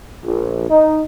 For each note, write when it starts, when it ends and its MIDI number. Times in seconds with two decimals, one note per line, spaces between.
0.25 0.70 34
0.70 1.01 63